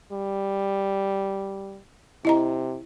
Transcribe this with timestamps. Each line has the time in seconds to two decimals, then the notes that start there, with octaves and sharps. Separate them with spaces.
0.12 G3
2.25 C3 E4 D#5 A#5